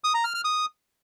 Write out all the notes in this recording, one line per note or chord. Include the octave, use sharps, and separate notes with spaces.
D#6
A#5
F6
F6
D#6